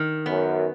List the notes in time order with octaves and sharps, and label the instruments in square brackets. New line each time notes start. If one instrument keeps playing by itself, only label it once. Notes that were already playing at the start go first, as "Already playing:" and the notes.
Already playing: [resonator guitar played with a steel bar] D#3
[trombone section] F#2 [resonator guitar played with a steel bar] B3